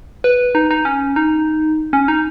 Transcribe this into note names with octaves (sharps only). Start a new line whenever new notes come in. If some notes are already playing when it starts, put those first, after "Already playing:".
B4
D#4
D#4
C#4
D#4
C#4
D#4